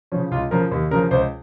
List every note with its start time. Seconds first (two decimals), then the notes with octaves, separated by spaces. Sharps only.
0.12 C#3 F3 C#4
0.31 C#2 F4
0.51 C#3 F3 A#4
0.71 D#2
0.91 C#3 A#4
0.95 F3
1.11 C#2 C5